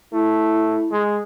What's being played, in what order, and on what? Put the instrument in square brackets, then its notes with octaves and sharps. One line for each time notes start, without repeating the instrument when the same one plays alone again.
[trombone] A3 [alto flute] E4
[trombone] G#3